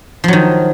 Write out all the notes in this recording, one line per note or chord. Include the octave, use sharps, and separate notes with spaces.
D#3 F3 F#3